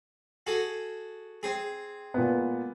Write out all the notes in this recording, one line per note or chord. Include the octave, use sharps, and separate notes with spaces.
F#4 G#4 A4
C4 G#4
A#2 G#3 B3